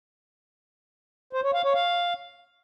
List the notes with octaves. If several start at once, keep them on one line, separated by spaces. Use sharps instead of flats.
C5
C#5
F5
C#5
F5